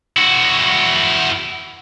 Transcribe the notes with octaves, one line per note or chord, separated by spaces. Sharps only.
E4 F#4